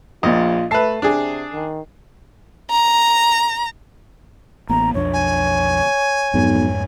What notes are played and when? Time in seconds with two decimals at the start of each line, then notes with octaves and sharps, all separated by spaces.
0.23 A#1 A#2 F4 D#5
0.71 A3 B4 E5 A5 C7
1.02 C3 D4 G#4
1.53 D#3
2.70 A#5
4.69 A1 A#3 B3 A#5
4.94 B1 F2 D4 C#5
5.13 G#5
6.34 B1 F2 G#2